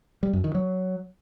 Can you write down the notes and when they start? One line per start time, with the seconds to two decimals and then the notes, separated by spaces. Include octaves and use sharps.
0.23 G3
0.33 F#2
0.44 D#3
0.55 F#3